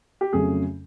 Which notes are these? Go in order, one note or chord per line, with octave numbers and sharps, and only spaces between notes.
G4
F2 C#3 F#3 A3 C#4 G#4